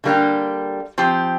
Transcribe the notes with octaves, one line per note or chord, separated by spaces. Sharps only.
D3 G3 A#3 D4 G4
F3 C4 G4